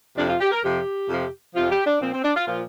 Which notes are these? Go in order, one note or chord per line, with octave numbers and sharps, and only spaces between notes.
F2 C3 F3 D4
F4
G4
A#4
F2 C3 F3 G4
F2 C3 F3
F2 C3 F3 F4
G4
D4
A#2 F3 C4
C4
D4
F4
A#2 F3 F4